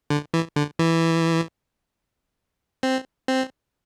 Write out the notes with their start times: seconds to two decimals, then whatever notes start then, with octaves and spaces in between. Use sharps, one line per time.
0.10 D3
0.34 E3
0.56 D3
0.79 E3
2.83 C4
3.28 C4